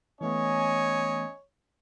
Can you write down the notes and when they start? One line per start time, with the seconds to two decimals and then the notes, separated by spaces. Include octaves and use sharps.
0.21 E3 A3 B3 C#4 C#5 D#5 G#5